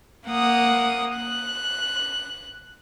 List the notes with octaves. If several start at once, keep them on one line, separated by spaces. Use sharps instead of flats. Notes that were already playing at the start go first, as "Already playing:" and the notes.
A#3 F#5 D#6
F#6